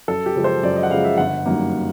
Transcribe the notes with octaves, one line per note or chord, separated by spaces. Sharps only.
F#2 A4
G4
C#3 F3 G#3
C5
F#2 D5
D#5
F#5
C#3 F3 G#3 F5
E5
G1 F#5
F#2 D#3 G3 A#3